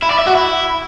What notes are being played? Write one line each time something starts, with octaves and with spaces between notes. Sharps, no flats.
E4
D5
E5
F#4
E4